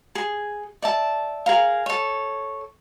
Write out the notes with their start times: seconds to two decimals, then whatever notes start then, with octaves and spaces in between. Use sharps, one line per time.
0.15 G#4
0.82 D5 E5 A5
1.46 G#4 A#4 F5
1.86 A4 C#5